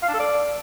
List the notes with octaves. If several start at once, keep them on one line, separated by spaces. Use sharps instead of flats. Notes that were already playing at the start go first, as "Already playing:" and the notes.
F5
D4
A4
D5